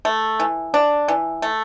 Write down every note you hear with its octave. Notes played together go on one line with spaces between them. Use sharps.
A3
E3
D4
E3
A3